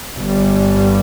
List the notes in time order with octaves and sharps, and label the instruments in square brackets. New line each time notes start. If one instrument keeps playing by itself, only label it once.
[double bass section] G1 G2 G3